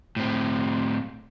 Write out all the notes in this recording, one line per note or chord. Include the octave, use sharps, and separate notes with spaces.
A2 C4